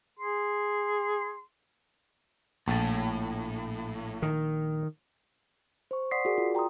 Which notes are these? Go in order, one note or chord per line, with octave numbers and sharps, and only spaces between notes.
G#4 C6
A#1 A2 A5
D#3
C5 C#6
D5 F#5 C6 D#6 B6 C7
F#4 G#4 A#4 D5
F4
G5 A#5 C6 D#6